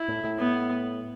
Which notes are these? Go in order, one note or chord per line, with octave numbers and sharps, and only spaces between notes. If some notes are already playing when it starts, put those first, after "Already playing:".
Already playing: E4
A2
A2
B3